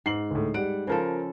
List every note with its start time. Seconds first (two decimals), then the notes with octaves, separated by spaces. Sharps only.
0.06 G#2 C7 F#7
0.31 D2 A2
0.54 G3 F#5 D7
0.87 C#3 F3 F4 A4 A#4 C5